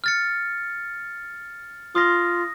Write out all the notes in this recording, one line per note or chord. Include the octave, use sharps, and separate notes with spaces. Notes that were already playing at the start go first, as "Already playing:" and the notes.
F6 A6 C#7
F4 D#6 A#6